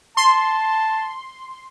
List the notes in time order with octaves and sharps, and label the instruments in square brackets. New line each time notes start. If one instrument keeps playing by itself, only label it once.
[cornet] A5 [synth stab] C6